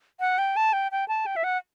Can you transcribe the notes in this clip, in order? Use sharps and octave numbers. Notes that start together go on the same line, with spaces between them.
F#5
G5
A5
G5
G5
A5
G5
E5
F#5